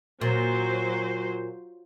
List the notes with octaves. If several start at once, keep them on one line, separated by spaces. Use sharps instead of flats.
A#2 F#3 C5